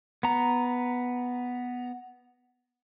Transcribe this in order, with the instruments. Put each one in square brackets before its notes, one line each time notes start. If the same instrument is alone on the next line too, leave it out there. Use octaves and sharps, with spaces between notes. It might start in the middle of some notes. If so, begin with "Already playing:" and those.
[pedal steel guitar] B3 A#5